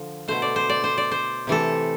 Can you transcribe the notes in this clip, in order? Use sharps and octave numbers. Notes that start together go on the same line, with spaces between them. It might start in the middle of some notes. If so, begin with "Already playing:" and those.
Already playing: D3 F3
B2 A3 C5
D5
C5
D5
C5
D5
C5
C3 E3 A3 A4